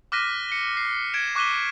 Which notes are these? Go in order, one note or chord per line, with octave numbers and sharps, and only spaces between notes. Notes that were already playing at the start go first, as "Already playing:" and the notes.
D6 F6 F#6 A#6 B6 D#7
C#7 G7
C7
G#6 D7 E7
C#6 D6 F#6 B6 D#7 G7